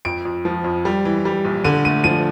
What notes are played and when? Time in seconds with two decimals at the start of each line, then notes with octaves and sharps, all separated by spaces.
0.05 F2 D7
0.25 F2
0.45 F3
0.64 F2
0.85 G3
1.05 E3
1.25 G3
1.45 A#1
1.64 D3 D#7
1.85 A3 D#7
2.04 F3 D#7